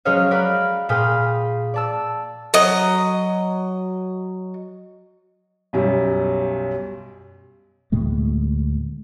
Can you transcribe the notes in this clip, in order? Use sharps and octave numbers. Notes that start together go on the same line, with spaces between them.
F#3 G#3 C#4 C#5 D#5 F5
A#4 D5 F5 F#5 B5
A#2 G#4 F5 G5 B5 D#6
D5 A5 E6
F#3 D#5
B1 F#2 G3
D2 A2 G#3 A#3